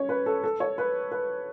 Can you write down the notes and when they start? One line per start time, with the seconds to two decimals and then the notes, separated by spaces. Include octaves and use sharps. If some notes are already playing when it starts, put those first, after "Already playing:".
Already playing: C#4 C#5
0.09 B4
0.26 A4
0.44 A4
0.60 C#5
0.78 B4
1.12 B4